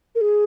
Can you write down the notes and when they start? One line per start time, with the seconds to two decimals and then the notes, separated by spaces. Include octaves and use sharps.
0.15 A#4
0.21 G#4